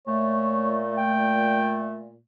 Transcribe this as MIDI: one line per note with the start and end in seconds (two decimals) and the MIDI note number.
0.07 2.19 46
0.07 2.19 57
0.07 0.82 73
0.97 1.83 79